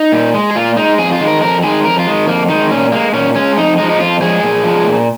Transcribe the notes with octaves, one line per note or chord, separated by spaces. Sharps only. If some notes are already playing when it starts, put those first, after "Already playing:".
Already playing: D#4
A#2
G#3
G#4
A#2 F4
G#3 D#4
F2 G#4
F4
D#3 G#3
A#4
F2 A#4
D#3 G#3 G#4
F2 A#4
F4
D#3 G#3
F2 A#3
D#3 G#3 D#4
A#2 C#4
G#3 A#3
A#2 C#4
G#3 C#4
F2 D#4
F3 G#3 D#4
D#4
F2 F4
F3 G#3 G#4
A#2
F3 G#3
A#2